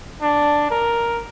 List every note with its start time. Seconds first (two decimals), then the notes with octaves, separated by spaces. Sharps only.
0.21 D4
0.71 A#4